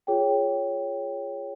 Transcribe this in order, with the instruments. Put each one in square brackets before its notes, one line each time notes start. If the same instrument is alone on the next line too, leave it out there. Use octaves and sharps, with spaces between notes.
[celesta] F4 G#4 C#5 G5